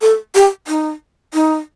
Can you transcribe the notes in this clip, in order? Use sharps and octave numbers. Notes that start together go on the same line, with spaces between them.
A4
G4
D#4
D#4